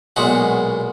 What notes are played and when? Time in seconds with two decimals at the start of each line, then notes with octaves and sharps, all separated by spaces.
0.16 B1 A#2 G#3 F#4